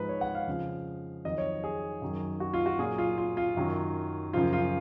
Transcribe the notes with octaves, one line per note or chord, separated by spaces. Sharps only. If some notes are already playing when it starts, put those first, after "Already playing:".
Already playing: G#2 F3 B4
C#5
F#5
F5
F2 C#3 F3
F2 D#3 F#3 D#5
C#5
G#4
F#2 D#3 F#3
F#4
F4
F#4
A#2 F#3 G#4
F4
F4
F4
F#2 D#3 F#3
F#2 C#3 F3 F4
F4